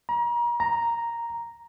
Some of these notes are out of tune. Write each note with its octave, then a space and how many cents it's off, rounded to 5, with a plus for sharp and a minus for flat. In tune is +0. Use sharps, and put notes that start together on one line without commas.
A#5 +35
A#5 +0